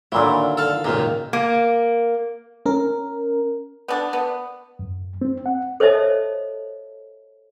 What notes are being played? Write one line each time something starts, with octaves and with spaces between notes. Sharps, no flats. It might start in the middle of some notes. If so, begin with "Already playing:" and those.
A#2 D3 D#3 F#3 A#3 E4
A4 F5
C#2 F#2 A#2 D#3 A#5
A#3
C#4 A#4
B3 D4
B3
F#2
C4
F#5
A4 C5 C#5 D#5 E5 A5